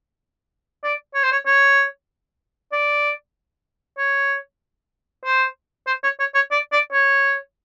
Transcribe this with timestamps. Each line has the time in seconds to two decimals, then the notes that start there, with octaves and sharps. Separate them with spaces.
0.84 D5
1.15 C#5
1.23 C5
1.32 C#5
1.46 C#5
2.72 D5
3.98 C#5
5.25 C5
5.87 C5
6.04 C#5
6.20 C#5
6.35 C#5
6.52 D5
6.72 D5
6.92 C#5